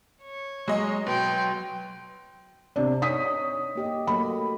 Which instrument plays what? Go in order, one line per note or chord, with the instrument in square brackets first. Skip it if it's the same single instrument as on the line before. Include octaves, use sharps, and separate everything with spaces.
[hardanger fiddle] C#5
[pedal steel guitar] F#3 [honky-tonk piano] G#3 D#5
[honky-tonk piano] B2 [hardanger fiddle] G5 C6
[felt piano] C3 D4
[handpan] D#4 C#5 [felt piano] D#6 B6
[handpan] C#5
A#3 G4 D#5
[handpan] F#3 A3 A#3 [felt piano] B5